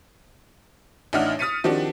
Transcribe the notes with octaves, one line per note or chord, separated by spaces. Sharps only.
A1 D4 D#4 E5 F#5 F6
D#6 F6 A6 B6 C#7 D#7
D#3 F3 C4 D4 F#4 G4